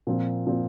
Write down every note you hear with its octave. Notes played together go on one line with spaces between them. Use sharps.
A#2 F3 C4
A#2 F3 C4